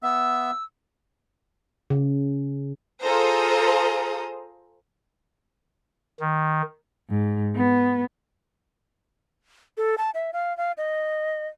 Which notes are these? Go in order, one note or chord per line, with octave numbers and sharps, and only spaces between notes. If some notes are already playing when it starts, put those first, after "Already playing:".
B3 E5 E6
C#3
F4 G#4 A4 C5 A#5 D#6
D#3
G#2
B3
A4
A5
E5
F5
F5
D#5